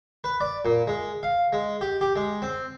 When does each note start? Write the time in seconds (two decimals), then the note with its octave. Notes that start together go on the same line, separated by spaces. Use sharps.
0.24 B4
0.41 D5
0.65 A#2
0.87 G#3
1.23 F5
1.53 G#3
1.81 G4
2.01 G4
2.16 G#3
2.42 C4